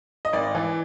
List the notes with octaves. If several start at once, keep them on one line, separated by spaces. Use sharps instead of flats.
D#5
G#1 D5
E3